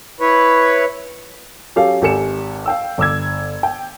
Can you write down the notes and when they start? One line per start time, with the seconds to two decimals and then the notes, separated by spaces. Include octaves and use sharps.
0.20 E4 B4 C#5
1.76 F#3 C#4 G4 A4 F5
2.02 G#1 G4 A4 G#5 C#7 E7
2.66 F5 G5 E6
2.98 G1 D6 E6 G#6
3.63 G5